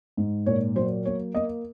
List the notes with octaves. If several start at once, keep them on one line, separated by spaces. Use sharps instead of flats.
G#2
A#2 C#5
F#3 C5
A#3 C#5
A#3 D#5